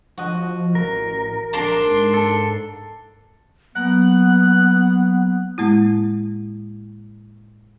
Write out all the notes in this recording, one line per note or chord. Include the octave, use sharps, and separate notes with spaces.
F3 F#4 D#5
A1 A#4
A#1 A#3 D4 A5 A#5 C6
G#2
A4
F#3 A#3 B3 F#5 F#6
A2 G#3 A#3 E4